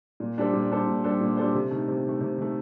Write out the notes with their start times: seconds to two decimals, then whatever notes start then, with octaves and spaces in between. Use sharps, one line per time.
0.20 A#2
0.38 G3 D4 A4 C5
0.53 A#2
0.71 G3 D4 A4 C5
0.87 A#2
1.04 G3 D4 A4 C5
1.21 A#2
1.37 G3 D4 A4 C5
1.55 C3
1.71 D#3 A3
1.88 C3
2.04 D#3 A3
2.21 C3
2.38 D#3 A3